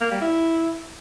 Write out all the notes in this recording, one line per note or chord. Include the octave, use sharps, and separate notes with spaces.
A#3
G3
E4